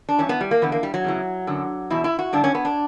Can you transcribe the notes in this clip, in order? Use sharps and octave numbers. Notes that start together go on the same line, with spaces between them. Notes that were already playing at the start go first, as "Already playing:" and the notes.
D4
G2 E3 C#4
B3
G3
A#3
E2 D3 B3
A#3
G3
F#3
E2 C#3 E3
F#2 D3
E2 B2 E4
E4
F#4
G2 D3 D4
C#4
B3
D4